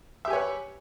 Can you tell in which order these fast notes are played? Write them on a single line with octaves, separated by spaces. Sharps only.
E5 G4 G#5 C#5 B4